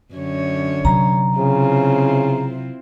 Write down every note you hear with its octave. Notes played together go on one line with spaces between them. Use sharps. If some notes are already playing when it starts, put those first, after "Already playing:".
F#2 D3 C#5
C3 F#3 A#5
C#3 C4 E4 F4